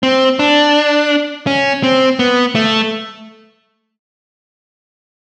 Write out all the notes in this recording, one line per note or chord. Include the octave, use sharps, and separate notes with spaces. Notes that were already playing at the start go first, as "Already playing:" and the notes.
C4
D4
C#4
C4
B3
A3